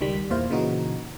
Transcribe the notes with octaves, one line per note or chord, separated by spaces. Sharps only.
C#2 D#3 G3 B6
E2 A#2 E4 C5 F5
A#2 C#3 E3 D#4 F#4